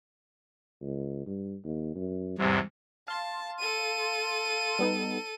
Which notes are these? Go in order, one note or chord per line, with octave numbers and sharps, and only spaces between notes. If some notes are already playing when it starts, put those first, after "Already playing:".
C#2
G2
D#2
F#2
E2 G#2 C3 G3
F5 A5 C6 A6
A4 D#7
G3 B3 D#4